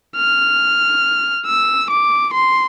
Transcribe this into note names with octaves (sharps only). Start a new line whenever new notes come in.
F6
E6
D6
C6